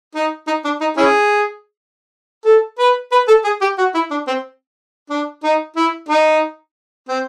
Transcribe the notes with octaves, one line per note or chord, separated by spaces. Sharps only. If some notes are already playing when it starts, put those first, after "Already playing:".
D#4
D#4
D4
D#4
C#4 E4 G#4
A4
B4
B4
A4
G#4
G4
F#4
E4
D4
C4
D4
D#4
E4
D#4
C4